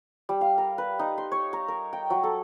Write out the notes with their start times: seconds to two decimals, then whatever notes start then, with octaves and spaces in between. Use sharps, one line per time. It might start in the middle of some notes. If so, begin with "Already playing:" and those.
0.29 G3
0.41 F5
0.58 A#4
0.78 B4
0.99 D#4
1.18 C6
1.32 C#5
1.53 A#5
1.68 A#4
1.93 G5
2.10 F#3
2.23 A4